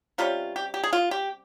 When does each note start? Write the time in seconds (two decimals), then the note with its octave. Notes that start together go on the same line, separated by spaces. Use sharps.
0.18 C3 G3 A#3 C#4 F4
0.56 G4
0.74 G4
0.84 G#4
0.93 F4
1.11 G4